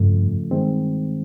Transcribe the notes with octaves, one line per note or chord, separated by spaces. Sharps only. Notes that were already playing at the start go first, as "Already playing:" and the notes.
Already playing: G2 C#3 F3 A3
G2 D#3 G#3 C4